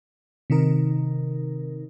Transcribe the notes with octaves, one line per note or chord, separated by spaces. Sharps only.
C3 D#3 D#4 A#4